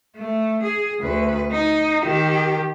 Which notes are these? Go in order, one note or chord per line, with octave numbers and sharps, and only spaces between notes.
A3
G#4
D2 B4
D#4
D#3 G4